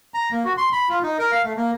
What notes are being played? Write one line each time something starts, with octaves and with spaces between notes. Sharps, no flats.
A#5
A#3
F#4
C6
B5
F4
D#4
A#4
F5
A3
A#3